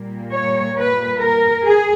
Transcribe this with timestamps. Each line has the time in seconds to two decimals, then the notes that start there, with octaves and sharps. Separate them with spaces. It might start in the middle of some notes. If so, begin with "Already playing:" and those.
Already playing: A#2 G3 A#3
0.32 C#5
0.77 B4
1.21 A#4
1.66 G#4